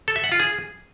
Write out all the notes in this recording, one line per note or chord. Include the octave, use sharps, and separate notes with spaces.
A4
E5
F#5
F4
G#4